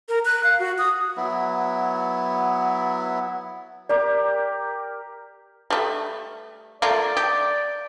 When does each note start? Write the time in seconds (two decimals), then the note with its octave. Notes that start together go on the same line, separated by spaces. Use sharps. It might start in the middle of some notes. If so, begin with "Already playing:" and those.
0.09 A#4
0.25 F#6
0.44 F5
0.59 F#4
0.78 D#6
1.17 F#3 B3 E4
3.89 G4 A#4 D5 D6
5.70 G3 A3
6.82 A3 A#3 F4 D5
7.17 G4